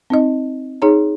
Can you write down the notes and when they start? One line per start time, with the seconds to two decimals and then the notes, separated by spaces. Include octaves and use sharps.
0.10 C4 D#4 D#5
0.82 D#4 G#4 C#5 A#5